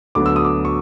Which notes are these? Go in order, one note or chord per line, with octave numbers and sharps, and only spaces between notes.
D2 D3 F#3 B3 D6
E6
D#6
D6
C#6